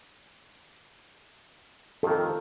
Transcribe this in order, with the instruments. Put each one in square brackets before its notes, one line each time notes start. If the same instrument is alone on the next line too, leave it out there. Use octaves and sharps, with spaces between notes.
[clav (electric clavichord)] F2 D#3 [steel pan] A4